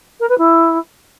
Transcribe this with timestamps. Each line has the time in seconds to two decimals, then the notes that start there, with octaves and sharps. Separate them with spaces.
0.20 A#4
0.29 B4
0.38 E4